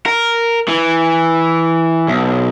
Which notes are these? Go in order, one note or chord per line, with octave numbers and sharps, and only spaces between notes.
A#4
E3
B1